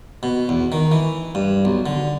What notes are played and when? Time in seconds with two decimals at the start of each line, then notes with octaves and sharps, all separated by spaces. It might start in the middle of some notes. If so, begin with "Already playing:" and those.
0.23 B2
0.49 E2
0.72 D#3
0.92 E3
1.35 G2
1.65 B1
1.86 D3